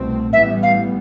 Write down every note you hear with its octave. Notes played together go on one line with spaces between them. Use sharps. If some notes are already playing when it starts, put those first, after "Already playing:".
Already playing: C2 B2 A3 C4
A1 A2 E3 G3 B3 E5
F5